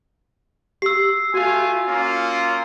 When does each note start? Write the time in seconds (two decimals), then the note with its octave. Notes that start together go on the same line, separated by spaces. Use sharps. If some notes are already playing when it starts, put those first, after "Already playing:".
0.82 G4 E6 C7
1.34 A3 F4 F#4 G#5
1.86 A#3 C#4 F4